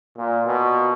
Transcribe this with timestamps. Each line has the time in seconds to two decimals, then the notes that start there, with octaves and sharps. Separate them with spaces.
0.17 A#2
0.47 B2